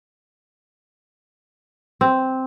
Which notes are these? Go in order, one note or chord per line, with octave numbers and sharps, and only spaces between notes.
C4